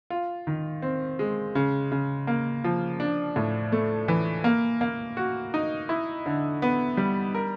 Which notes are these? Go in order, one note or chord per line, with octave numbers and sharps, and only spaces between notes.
F4
D#3
C4
G#3
C#3
C#3
A#3
F3
D4
A2
A3
E3
A#3
A#3
F#4
D#4
E4
D3
B3
G3
A#4